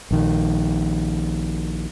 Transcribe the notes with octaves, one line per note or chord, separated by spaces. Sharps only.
A#1 D#3